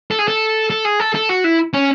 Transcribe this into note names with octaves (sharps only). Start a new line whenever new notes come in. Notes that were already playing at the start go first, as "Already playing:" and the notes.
A4
G#4
A4
A4
G#4
A4
A4
F#4
E4
C#4